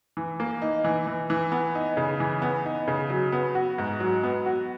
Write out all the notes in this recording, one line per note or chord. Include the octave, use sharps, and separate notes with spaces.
E3
A#3
D#4
E3
E3
E3
B3
D#4
C#3
E3
B3
D#4
C#3
F#3
B3
F#4
G#2
F#3
B3
F#4